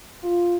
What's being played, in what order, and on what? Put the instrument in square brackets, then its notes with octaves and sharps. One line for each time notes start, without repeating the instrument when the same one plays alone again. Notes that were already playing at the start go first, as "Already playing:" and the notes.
[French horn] F4